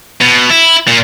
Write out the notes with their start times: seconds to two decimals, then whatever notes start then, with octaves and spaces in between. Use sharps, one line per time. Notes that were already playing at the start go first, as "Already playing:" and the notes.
0.21 B2
0.50 E4
0.87 A#2